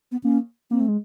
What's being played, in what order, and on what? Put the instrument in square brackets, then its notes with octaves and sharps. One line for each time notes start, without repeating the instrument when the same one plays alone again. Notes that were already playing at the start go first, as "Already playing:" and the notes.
[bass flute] B3
[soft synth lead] A#3 [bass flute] C#4
[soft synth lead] A#3 [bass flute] C4
[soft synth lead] A3
G#3